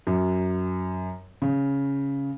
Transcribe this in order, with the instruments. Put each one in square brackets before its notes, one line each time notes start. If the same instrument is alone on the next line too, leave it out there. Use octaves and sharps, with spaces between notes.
[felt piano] F#2
C#3